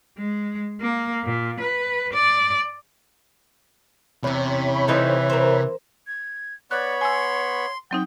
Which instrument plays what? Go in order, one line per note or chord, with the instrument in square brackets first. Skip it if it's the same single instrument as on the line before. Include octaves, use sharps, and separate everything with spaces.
[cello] G#3
A#3
A#2
B4
D5
[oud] E2 C#4 [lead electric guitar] C3 [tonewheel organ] C#5 B5
[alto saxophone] E3 [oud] C4 D#4 A4
[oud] A#4 C5
[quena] G#6
[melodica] B3 B5 C#6 [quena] C#5 [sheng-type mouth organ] D5 [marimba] F#6
[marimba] G#5 E6 [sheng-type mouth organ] C6
[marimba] F#3 C4 D#4 [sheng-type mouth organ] G5